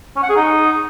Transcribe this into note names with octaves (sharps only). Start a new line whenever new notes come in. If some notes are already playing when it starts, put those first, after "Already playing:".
C#4
F#5
G#4
D#4